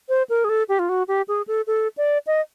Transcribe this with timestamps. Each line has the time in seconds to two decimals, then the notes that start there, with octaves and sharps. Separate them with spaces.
0.09 C5
0.29 A#4
0.44 G#4
0.49 A4
0.69 G4
0.79 F4
0.89 F#4
1.08 G4
1.28 G#4
1.47 A4
1.67 A4
1.97 D5
2.27 D#5